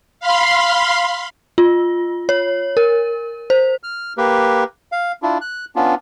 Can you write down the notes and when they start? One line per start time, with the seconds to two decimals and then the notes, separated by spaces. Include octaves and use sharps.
0.20 F5 B5 C6
1.58 F4
2.29 C#5
2.77 A#4
3.50 C5
3.83 F6
4.18 A#3 G4 B4
4.92 F5
5.22 D4 E4 F4
5.41 F#6
5.76 B3 C#4 D4 F4